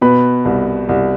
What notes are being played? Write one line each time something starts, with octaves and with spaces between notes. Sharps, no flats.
B2 B4 B5
C2
C2